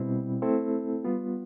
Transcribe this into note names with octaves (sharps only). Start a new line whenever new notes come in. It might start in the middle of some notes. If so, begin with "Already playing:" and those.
Already playing: B2 G3 C4 E4
A3 C4 E4 A4
G3 B3 F4